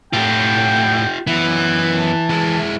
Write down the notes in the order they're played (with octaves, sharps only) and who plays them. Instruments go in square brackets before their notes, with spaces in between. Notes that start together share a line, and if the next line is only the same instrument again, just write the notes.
[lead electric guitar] A2 [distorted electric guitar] F4 G4 [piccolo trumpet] G5
[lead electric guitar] F#2 B3 [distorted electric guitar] E3
[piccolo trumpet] A5
[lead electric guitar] G#3 E4